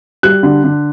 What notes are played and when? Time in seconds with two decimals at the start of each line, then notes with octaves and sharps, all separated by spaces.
0.23 G3 F#6
0.43 D3
0.64 D3